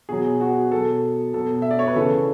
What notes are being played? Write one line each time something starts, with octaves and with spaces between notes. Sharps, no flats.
B2 F#3 G#4
F#4
B2 F#3 A4
B2 F#3 A4
E5
D5
C#5
B4
C#3 E3 A4